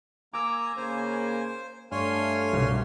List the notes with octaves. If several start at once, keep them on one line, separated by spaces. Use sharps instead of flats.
A#3 G#5 A#5 D6 E6
C#3 A#3 C5
G2 A3 D4 C#5 F5 G#5 C6
C2 B2